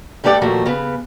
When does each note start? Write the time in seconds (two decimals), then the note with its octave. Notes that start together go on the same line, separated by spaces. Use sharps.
0.24 G2 G3 A3 G4 D5 F#5
0.41 D#2 A#2 F3 A3 F#4
0.66 C#3 B3